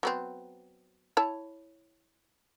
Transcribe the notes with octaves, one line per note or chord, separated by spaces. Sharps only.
F#3 B3 C4
E4 C#5 A5